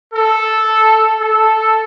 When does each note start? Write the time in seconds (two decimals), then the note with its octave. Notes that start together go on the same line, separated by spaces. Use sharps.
0.13 A4
1.21 A4